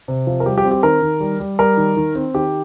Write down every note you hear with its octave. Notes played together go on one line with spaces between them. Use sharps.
C3
F3
A#4
G3 G4
G4
C4
G4
D#3 A#4
D#3
G3
G3
G3 A#4
D#3
D#3
C4
D#3 G4